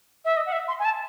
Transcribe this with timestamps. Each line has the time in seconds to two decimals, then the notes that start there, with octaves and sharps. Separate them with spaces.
0.25 E5
0.37 D#5
0.46 F#5
0.52 E5
0.68 C6
0.79 G#5
0.85 A5